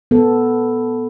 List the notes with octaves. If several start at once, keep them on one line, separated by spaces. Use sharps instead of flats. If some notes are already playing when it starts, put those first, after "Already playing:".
B3 A4